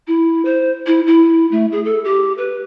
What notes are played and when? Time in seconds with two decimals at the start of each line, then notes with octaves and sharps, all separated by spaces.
0.07 E4
0.45 C5
0.87 E4
1.07 E4
1.51 A3
1.72 G#4
1.85 A4
2.05 G4
2.38 B4